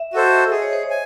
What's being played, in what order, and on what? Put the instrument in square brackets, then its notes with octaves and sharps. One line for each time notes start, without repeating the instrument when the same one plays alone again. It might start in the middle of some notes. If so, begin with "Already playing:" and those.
Already playing: [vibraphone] E5
[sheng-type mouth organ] F#4 A4 C5 [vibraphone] D#5
[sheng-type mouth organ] G#4 [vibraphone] D#5
[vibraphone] C#5
C5
C#5
[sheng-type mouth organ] G#5